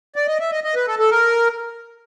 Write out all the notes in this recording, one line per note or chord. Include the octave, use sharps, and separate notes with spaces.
D5
D#5
E5
D#5
D#5
B4
A4
A4
A#4